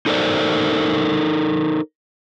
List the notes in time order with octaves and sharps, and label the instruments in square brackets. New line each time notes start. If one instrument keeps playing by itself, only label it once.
[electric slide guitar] D#4 A4 A#4 C5 D5